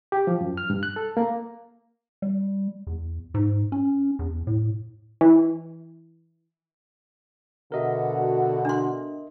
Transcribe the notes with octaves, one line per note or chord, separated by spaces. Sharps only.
G4
F3
F#2
F6
G2
F#6
A4
A#3
G3
E2
G#2
C#4
E2
A2
E3
B2 D3 F#4 A#4 D#5 E5
D4 C6